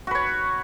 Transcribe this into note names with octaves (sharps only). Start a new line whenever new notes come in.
F#4 B4 C#5